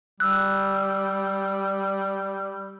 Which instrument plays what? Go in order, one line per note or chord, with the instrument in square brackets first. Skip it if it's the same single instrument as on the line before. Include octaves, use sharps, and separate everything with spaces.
[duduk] G3 [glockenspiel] E6 F#6